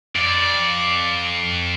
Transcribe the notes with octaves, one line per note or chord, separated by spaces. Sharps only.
F2 D5